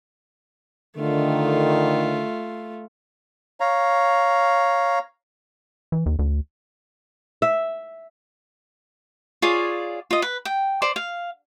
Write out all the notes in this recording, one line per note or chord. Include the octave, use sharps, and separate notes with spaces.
D3 D#3 A3 F4
C#5 F5 A#5
E3
D#2
D2
E5
F4 G#4 C#5 D5
F4 D#5
B4
G5
C5 D5 C6
F5